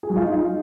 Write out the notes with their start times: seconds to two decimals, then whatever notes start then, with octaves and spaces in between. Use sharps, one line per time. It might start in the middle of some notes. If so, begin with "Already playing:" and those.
0.03 G#4
0.10 F#3
0.16 F4
0.23 D#4